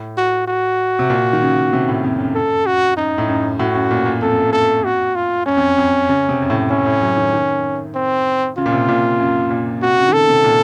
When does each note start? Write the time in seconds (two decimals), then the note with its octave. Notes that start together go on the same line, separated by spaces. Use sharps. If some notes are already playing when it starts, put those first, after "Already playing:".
Already playing: A2
0.18 F#4
0.48 F#4
0.99 C3
1.10 A#2
1.33 D#3
1.42 C#3
1.73 C3
1.89 A2
2.04 F2
2.19 F#2
2.35 A4
2.66 F#4
2.97 F#2 D#4
3.18 A2
3.29 F#2
3.59 A2 F#4
3.75 F#2
3.91 A#2
4.06 A#2
4.22 F2 A4
4.33 F#2
4.45 F2
4.53 A4
4.84 F#4
5.16 F4
5.46 F#2 C#4
5.57 F2
5.78 F2
6.09 C#3
6.29 C3
6.42 F#2
6.50 A2
6.70 A2 C#4
6.86 A2
7.02 F#3
7.17 D#3
7.33 D#3
7.95 C4
8.58 C#3 F4
8.66 A#2
8.72 C3
8.89 A#2
9.20 F#2
9.50 A#2
9.82 C3 F#4
9.98 C#3
10.08 D#3
10.13 C#3 A4
10.29 C3
10.44 A#2